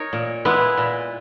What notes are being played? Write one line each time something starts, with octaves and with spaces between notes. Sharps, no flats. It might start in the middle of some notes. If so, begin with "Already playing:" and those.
Already playing: D#4 A#4 C#5
A#2
G#3 B3 E4 B4
A#2